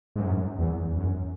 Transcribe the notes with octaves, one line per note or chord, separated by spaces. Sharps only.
G#2
F#2
E2
F#2